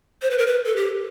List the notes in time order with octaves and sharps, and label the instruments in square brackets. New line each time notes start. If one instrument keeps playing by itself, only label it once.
[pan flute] C5
B4
A#4
B4
A4
G4